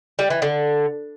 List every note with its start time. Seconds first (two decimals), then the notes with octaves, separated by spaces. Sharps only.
0.19 G3
0.30 E3
0.42 D3